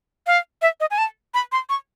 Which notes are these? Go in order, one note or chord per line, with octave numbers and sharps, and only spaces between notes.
F5
E5
D#5
G#5
A5
B5
C6
C#6